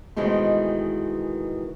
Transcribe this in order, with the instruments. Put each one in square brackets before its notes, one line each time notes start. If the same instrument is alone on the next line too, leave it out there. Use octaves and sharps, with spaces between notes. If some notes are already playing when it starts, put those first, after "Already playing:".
[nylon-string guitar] B2 D#3 E3 G#3 A3 C4